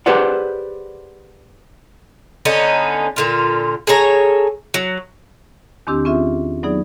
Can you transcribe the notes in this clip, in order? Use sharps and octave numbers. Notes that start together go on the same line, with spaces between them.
G4 G#4 B4 C5 D5 F#5
D3 B3 C#4 D#4
A#2 D3 F4
G#4 A4 C#5 A#5
F#3
E2 D#3 C4 D4 G4 E6
C4 C#4 F4 G#4 E5
F#3 B3 D#4 G#4 D5